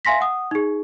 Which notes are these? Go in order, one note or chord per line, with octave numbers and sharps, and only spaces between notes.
E5 F5 G#5 C6 A#6 B6
F#5 D#6
D#4 G#4